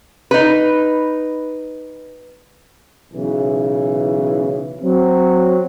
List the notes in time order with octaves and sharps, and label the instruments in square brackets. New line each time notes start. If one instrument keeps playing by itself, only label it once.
[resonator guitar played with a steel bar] D#4 B4
[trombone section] B1 C#3 E3
F#3 C4